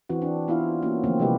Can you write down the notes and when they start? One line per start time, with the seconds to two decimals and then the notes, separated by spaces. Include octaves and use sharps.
0.09 E3 C4 F#4
0.22 D4
0.48 B3 E4 F4 F5
0.82 A#3 C#4 F#4
1.04 D3 E3 F3 A3 A#3 C4
1.19 C3 E3 G3 G#3 G4 B4